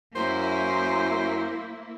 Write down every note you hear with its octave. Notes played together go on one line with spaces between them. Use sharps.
F#2 A#3 E4 C5